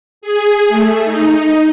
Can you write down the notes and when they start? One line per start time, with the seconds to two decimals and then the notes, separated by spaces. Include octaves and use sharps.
0.21 G#4
0.68 A3
1.04 D#4